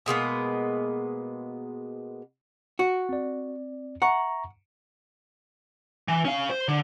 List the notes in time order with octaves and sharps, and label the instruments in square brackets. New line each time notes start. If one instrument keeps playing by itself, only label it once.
[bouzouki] B2 G#3 A#3 B3
[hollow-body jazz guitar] F#4
[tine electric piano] C4 D5
[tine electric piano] E5 A#5 C#6 [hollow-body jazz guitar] F#5
[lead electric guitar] E3
C#4 F5
C5
D3